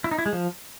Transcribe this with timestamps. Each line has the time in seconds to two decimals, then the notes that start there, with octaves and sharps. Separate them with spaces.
0.04 E4
0.11 D#4
0.19 E4
0.26 G#3
0.33 F3